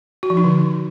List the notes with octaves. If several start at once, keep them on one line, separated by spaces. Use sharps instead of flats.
F#4
F3
D#4
D3